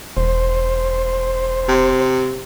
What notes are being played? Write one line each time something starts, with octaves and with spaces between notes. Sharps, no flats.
E1 C5
C3